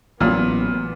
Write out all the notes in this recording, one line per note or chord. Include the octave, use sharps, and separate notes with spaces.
A1 A#2 F#3 B3